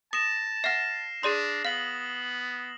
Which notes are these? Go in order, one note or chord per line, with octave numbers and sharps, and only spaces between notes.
A5 D#6 A#6 E7
E5 F#5 F6 A#6 C7
D4 G#4 D5 C6 D#6
B3 F5 F6 F#7